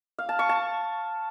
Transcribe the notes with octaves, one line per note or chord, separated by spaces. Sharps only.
F5
A5
C#6
A5